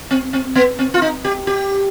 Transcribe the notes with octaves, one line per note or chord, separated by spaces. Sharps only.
C4
C4
B3
C4
F4
D#4
G4
G4